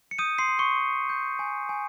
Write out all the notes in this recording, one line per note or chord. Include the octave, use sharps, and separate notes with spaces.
C#7
D#6 G6 D#7
C6 C7
C6
C#6 C#7
C6
G6
G#5
G#5